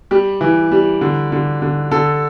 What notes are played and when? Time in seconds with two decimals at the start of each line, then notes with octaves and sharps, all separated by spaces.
0.11 G3 G4
0.41 E3
0.72 G3
1.01 D3
1.32 D3
1.62 D3
1.91 D3 A4